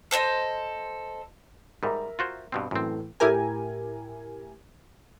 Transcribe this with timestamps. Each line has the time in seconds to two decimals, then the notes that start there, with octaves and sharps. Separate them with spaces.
0.11 A4 C5 D5 D#5
1.83 G#2 G3 A#4 E5 A#5
2.19 F4 F#4 C5
2.52 G2 B2 C4
2.71 F#2 A2 E3 A3 C4
3.20 A2 E4 G4 A#4 G#5